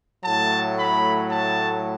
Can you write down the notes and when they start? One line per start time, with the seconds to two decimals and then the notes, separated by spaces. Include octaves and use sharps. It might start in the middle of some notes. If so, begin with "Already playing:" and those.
0.23 A2 F#3 A3 A5
0.76 B5
1.29 A5